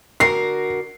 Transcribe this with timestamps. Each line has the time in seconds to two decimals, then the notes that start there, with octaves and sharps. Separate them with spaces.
0.20 D3 F#4 A#4 C7